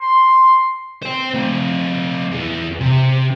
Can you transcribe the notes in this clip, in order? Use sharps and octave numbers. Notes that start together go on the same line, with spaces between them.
C6
C5 G5
A3 C4
E2
C3